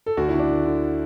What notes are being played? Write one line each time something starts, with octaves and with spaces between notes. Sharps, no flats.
A4
D2 F#4
D3 E4
D4
D2
D3